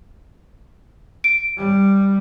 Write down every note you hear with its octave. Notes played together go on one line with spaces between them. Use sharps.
D7
G3